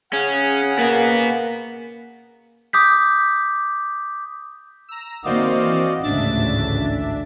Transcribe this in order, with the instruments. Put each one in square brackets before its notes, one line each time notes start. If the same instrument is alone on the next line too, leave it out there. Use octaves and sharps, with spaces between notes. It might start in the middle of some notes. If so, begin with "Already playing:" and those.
[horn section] C#3 G#4 F#5 [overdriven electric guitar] C#4
[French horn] A#3 [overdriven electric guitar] B3 F#4
[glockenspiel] D6 D#6 G6 B6
[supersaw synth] A#5 E6
[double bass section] D#3 A#3 [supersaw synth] C4 C5 F5 [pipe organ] F#4 D5 D#5
[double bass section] E3
[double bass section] A1 D2 G#2 [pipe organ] C#3 A6 [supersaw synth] D4 E5